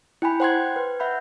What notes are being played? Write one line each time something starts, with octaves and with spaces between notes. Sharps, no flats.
E4 G5 G#5 B5
C5 F#5 G5 C6 F#6 G#6
B4
E5 F#5 B5 G6